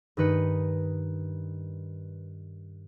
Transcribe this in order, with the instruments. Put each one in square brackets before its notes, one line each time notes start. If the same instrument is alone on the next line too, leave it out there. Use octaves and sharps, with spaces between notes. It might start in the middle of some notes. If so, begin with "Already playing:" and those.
[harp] G2 D#3 D#4 B4 C#7